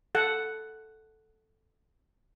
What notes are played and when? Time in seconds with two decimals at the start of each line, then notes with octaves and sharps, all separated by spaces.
0.15 A4 F#5